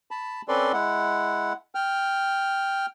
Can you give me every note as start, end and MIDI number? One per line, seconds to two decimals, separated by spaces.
0.11 0.42 81
0.11 0.42 83
0.48 0.72 60
0.48 0.72 61
0.48 0.72 69
0.48 0.72 71
0.48 0.72 74
0.48 0.72 84
0.73 1.53 56
0.73 1.53 64
0.73 1.53 78
1.75 2.86 79
1.75 2.86 89